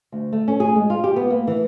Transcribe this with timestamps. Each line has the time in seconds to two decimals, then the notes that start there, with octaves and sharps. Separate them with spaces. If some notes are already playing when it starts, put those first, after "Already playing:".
0.12 D2
0.32 A3
0.48 C#4
0.60 G#4
0.76 G#3
0.90 F4
1.04 G4
1.16 B3
1.30 A#3
1.47 E3